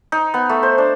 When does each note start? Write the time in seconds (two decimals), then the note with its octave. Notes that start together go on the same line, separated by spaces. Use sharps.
0.12 D#4
0.34 B3
0.49 A3
0.63 C5
0.78 D4